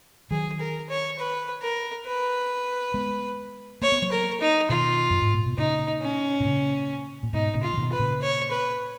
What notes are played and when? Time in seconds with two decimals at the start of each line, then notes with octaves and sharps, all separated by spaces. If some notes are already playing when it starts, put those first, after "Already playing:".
0.31 D#3 F#3 G#4
0.60 A#4
0.89 C#5
1.19 B4
1.62 A#4
2.06 B4
2.94 G#3 B3
3.82 A#3 C#5
3.92 B3
4.02 F#3 A#3
4.11 A#4
4.40 D#4
4.69 B2 D#3 F4
5.10 F#2
5.22 G#2
5.34 A#2
5.46 B2
5.58 A#2 C#3 D#4
6.02 C#4
6.40 B2
6.45 A#2 C#3
7.23 A#2
7.33 G#2 B2 D#4
7.55 A#2 C#3
7.63 F4
7.73 F3
7.77 B2 D#3
7.92 B4
7.99 A#2 C#3
8.22 C#5
8.51 B4